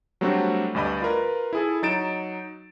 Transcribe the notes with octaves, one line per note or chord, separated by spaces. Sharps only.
F#3 G3 A3 C4 D4 F#4
D2 G2 D5 D#5 B5
F4 A#4 B4
E4 G#4 A4
F#3 D#4 A6 D7 E7